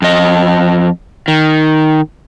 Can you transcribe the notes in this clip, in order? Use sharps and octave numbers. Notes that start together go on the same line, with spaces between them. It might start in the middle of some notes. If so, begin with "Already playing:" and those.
F2 D#5
D#3